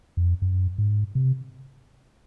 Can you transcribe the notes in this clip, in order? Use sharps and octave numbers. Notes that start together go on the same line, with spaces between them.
F2
F#2
G#2
C3